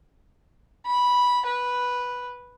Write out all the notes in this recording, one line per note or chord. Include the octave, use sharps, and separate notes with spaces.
B5
B4